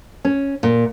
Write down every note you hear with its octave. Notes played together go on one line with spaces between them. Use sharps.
C#4
A#2